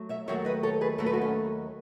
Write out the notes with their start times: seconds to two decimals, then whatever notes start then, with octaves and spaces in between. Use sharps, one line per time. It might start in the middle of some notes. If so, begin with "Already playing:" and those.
Already playing: F#3 A3
0.09 C#5 E5
0.28 D#2 D#3 F#3 A3 C#5 E5
0.45 B4 D#5
0.63 A4 C#5
0.81 G#4 B4
0.98 D#2 D#3 F#3 A3 A4
1.06 B4
1.13 F#4 A4
1.22 C#4